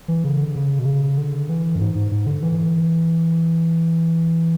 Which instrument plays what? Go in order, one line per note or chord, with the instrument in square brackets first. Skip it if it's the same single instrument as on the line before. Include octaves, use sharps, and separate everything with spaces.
[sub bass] E3
C#3
D3
C#3
B2
C#3
D3
E3
F#2
G#2
G#2
G#2
D3
E3